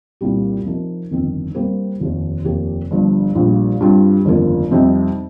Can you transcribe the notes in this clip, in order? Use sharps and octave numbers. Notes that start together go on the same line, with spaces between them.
C2 A#2 G3 A#3 G4
C3 F3 D#4 A#4
G1 F2 D#3 C4
C3 G3 A#3 G4 C5
F1 D#2 D#3
F1 D#2 D#3 A#3 G4
G1 G2 F3
A#1 A#2 G3
G2 G3 C4 F4
G1 F2 D#3 A#3 F4
F2 C3 G3 C4 D#4